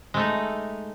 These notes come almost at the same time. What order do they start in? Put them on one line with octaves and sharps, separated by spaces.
G#3 A3 D#4